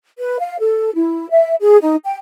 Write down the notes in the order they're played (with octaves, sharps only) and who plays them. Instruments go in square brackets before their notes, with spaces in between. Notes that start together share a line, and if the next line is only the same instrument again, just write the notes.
[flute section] B4
F5
A4
E4
E5
G#4
D#4
G5